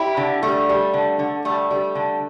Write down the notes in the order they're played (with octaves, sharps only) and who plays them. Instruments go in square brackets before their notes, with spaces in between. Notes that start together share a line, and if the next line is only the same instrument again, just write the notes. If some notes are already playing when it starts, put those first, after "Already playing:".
Already playing: [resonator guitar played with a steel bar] E4 G4
D3
G3 A3
G3
D3
D3
G3 A3
G3
D3